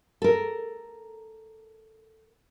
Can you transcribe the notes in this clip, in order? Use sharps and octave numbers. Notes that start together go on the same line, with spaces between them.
A4 A#4